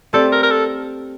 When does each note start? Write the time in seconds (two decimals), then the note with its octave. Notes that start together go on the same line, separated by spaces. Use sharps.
0.13 A3 C4 G4 A4 D5
0.32 A#4
0.43 A#4
0.51 A4